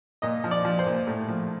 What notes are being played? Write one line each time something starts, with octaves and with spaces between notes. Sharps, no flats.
A#2 D#5
F3
D5
F3
C5
A#2
A2
F3